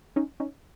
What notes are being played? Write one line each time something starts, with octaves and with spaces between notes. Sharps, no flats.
C#4 D#4
C#4 D#4